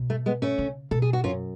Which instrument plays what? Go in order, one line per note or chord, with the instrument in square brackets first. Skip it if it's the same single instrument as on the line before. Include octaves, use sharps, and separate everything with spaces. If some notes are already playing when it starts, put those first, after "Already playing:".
Already playing: [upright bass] B2
[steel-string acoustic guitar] A3
G#3 B3
A3 C#4
[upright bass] C#3
[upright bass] B2 [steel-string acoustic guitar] A4
[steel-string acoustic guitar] G#4
F#4
[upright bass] F#2 [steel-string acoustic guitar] C#4 F4